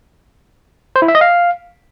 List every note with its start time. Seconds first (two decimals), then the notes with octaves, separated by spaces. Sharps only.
0.96 C5
1.02 E4
1.08 E5
1.15 D#5
1.21 F5